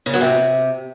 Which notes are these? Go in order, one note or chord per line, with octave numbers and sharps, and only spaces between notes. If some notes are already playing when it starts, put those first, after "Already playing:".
C#3
F#3
C3